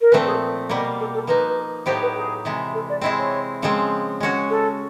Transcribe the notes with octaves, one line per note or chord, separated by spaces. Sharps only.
A#4
A#2 F3 A3 C4 B4
G#4
B2 G3 A#3
A4
A4
F3 A#3 D#4 B4
A2 F#3 B3 D#4 G4 C5
B4
G#4
C3 E3 G#3
A4
D5
G#3 C4 E4 G#4 D#5
C#5
C#3 F3 G#3 C4
G#3 C#4 F#4
A4